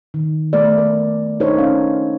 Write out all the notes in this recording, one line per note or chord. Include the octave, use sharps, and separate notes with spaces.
D#3
A3 B3 A4 D5
A#4
D4 D#4 A4 A#4 C5 C#5
C#4 A#4 F5